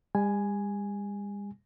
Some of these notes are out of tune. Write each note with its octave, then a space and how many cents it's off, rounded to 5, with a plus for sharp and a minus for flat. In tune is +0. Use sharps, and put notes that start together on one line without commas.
G3 +45 G#5 +0